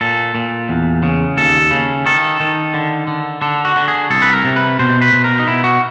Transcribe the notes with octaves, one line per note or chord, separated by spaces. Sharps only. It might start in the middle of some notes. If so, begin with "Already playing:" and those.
A#2 A4
A#2
E2
C#3
D#2 A4
C#3
D#3 A4
D#3
D3
D3
D3 A4
F#4
D3
G#4
C2 A4
B4
A#4
C3
B4
B2 C5
B4
B2
A#4
D#4
B2 E4
F#4